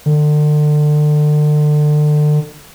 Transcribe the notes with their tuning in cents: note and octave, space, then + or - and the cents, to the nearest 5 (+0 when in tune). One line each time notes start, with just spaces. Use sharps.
D3 +35